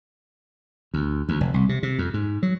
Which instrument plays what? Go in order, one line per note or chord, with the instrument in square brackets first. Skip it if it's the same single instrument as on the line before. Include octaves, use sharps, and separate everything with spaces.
[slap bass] D2
D2
F1
C2
C3
C3
F2
G#2
F#3